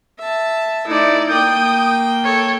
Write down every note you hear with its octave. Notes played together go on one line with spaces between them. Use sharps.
E5 A5
A3 D#4 E4 D5
A#3 G5 D#6 G6
A4 C#5